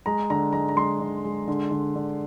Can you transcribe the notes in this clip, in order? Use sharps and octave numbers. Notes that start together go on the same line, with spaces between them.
G#3 A#5
D3 A#5
G#3 A#5
A#5
G#3 C6
D3
G#3
D3
D3
D3